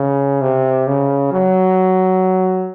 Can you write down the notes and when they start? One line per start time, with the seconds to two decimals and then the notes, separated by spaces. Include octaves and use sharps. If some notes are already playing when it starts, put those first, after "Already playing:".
Already playing: C#3
0.41 C3
0.87 C#3
1.32 F#3